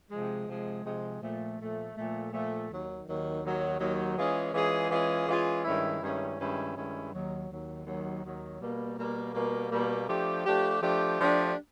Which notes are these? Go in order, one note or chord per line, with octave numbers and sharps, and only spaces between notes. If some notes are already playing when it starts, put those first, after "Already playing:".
C3 F3 G#3
C3 F3 G#3
C3 F3 G#3
A#2 F3 A3
A#2 F3 A3
A#2 F3 A3
A#2 F3 A3
D#2 D#3 F#3
D#2 D#3 F#3
D#2 D#3 F#3
D#2 D#3 F#3
E3 G#3 C#4 F4 G#4
E3 G#3 C#4 F4 G#4
E3 G#3 C#4 F4 G#4
E3 G#3 C#4 F4 G#4
G2 D#3 G#3 C#4 E4
G2 D#3 G#3 C#4 E4
G2 D#3 G#3 C#4 E4
G2 D#3 G#3 C#4 E4
D#2 D#3 F#3
D#2 D#3 F#3
D#2 D#3 F#3
D#2 D#3 F#3
B2 G3 A#3
B2 G3 A#3
B2 G3 A#3
B2 G3 A#3
F3 A3 D4 G4
F3 A3 D4 G4
F3 A3 D4 G4
F3 A3 D4 G4